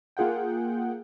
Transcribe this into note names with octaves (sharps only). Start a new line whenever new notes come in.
A#3 F4 G#4 F#5 G5